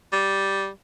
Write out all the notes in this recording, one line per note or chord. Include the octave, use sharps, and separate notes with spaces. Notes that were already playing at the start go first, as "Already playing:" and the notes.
G3